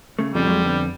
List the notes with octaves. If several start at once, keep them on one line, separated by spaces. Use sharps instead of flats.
C#3 A3
F2 A#2 C#3 G3
F#3 G#3
D3 B3 D4